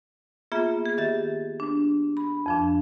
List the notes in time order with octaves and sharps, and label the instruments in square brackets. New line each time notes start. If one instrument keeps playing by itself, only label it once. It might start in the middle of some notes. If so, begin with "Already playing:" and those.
[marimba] A#3 B3 F4 G#4 E5
G#4
D#3 G4 E5 A6
D4
B5
F2 F3 D4